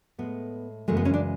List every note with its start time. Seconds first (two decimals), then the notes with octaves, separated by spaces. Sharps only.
0.18 A2 G#3 B3
0.88 F#2 C#3 E3 G#3 A3
0.97 B3
1.05 C#4
1.14 D4